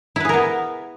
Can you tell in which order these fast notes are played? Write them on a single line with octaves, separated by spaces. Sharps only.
E4 B4 G#4 A#4 B3